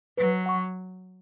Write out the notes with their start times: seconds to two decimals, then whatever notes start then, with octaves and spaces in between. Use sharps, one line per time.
0.17 F#3 B4
0.46 F#5 C#6